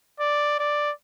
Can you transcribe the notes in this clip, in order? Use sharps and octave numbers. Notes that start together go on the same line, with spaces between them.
D5
D5